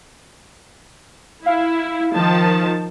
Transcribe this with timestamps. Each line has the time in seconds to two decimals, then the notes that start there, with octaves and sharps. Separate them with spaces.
1.46 E4 F5
2.14 D#3 F3 A5